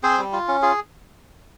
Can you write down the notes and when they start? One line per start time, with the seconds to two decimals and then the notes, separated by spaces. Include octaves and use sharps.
0.03 C4 G#4 C5
0.18 G3
0.33 F4
0.48 C#4
0.62 F4 G#4